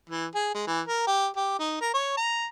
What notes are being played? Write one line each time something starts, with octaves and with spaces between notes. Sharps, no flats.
E3
G#4
G#3
E3
A#4
G4
G4
D#4
A#4
C#5
A#5